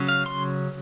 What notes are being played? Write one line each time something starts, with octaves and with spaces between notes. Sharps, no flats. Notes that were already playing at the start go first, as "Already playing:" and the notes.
Already playing: C#3 F#3 C#4
F5
C6